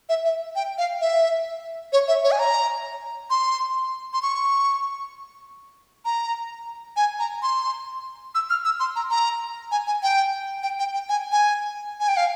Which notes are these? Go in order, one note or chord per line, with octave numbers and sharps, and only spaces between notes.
E5
E5
G5
F5
E5
C#5
E5
C#5
G#5
A#5
C6
C6
C#6
A#5
G#5
A#5
C6
E6
F6
E6
C6
A#5
A#5
G#5
G#5
G5
G5
G5
G5
G#5
G#5
G#5
G5
F5